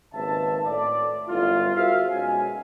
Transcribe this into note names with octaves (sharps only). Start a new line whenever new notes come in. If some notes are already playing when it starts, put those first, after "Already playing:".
G#1 D#2 C#3 B4 E5 A5
A2 D5
G1 F#2 D3 E4 F4
F#4 G#4 A#4 C5 E5 F5
B1 F#3 G#3 C#4 G#5